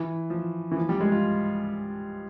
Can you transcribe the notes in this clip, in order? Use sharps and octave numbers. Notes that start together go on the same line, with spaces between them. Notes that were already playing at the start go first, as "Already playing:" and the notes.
Already playing: E3
F3
E3
F3
G3
G#3
F4